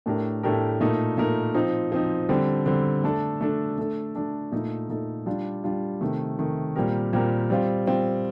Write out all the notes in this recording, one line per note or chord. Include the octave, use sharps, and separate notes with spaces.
A2 A3 D4 G4 A#4
A2 A3 D4 G4 A#4
A#2 A3 D#4 A#4
A#2 A3 D#4 A#4
F3 C4 D#4
F3 C4 D#4
D3 G3 C4
D3 G3 C4
A3 D4 A4
A3 D4 A4
A3 D4 A4
A3 D4 A4
A#2 A3 D#4 A4
A#2 A3 D#4 A4
G3 D4 F4
G3 D4 F4
C3 D#3 A3
C3 D#3 A3
A#2 G3 C4 G4 A#4
A#2 G3 C4 G4 A#4
G3 C4 F4
G3 C4 F4